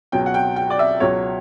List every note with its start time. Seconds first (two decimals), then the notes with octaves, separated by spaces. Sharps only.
0.12 C#2 B2 F#3 G5
0.26 F#5
0.34 G5
0.56 G5
0.70 D5
0.79 E5
1.00 C#2 B2 F#3 C#5